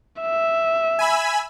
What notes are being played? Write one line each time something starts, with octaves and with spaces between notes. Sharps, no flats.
E5
G#5 B5 E6